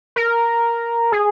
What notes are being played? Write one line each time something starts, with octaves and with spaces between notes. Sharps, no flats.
A#4
G#4